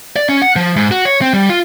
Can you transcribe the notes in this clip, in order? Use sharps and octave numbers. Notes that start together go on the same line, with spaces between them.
D5
C#4
F#5
F3
G#2
F#4
C#5
C4
G3
F4